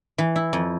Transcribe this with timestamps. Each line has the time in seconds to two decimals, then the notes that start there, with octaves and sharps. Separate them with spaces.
0.18 E3
0.36 E4
0.53 F2